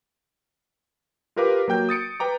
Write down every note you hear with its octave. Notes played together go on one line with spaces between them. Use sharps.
F4 G4 A#4 B4 F5 D6
F#3 A#3 G5 G6
D#6 A6 C#7 D7
B4 G5 A#5 D6